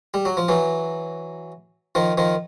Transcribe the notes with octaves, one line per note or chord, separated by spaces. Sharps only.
G3
F#3
F3
E3 F#3
D#3 F3
D#3 F3